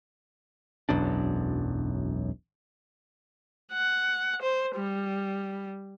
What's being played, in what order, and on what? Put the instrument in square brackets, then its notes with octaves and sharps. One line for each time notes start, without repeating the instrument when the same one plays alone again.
[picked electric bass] E1 B1 F#2 D4
[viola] F#5
C5
G3